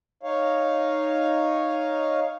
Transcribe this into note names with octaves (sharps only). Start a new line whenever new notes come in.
D#4 C#5 F5